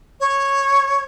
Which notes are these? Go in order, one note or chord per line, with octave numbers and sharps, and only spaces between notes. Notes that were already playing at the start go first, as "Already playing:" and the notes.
C#5